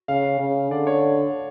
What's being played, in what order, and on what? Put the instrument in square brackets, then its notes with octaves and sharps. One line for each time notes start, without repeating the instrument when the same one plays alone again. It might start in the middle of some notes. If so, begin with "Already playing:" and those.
[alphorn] C#3 [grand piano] F5
[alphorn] C#3 [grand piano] F5
[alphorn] D3 [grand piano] D5
[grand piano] C#5